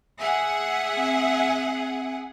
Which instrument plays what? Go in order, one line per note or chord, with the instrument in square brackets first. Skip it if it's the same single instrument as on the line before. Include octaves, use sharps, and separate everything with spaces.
[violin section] G#4 F#5 [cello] E5 [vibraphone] G#5
[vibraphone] C4